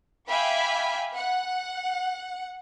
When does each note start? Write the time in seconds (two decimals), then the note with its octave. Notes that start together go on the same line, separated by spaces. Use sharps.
0.28 E5 F5 G5 G#5 B5 D6
1.15 F#5